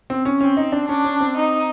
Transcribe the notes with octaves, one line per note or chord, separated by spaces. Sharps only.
C4
C#4
C4 C#4
D#4
D4
C#4 D4
C#4
C4
D#4